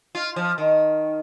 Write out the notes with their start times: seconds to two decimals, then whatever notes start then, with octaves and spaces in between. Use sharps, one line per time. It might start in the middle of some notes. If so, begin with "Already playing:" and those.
0.15 F4
0.36 F3
0.58 D#3